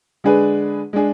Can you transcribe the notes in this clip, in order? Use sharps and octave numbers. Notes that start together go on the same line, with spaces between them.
D3 G#3 D4 G#4 B4
G#3 D4 G#4